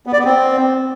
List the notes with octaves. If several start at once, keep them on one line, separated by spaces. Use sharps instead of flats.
B3
D5
B3
C4